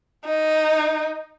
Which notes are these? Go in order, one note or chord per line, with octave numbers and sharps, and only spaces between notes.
D#4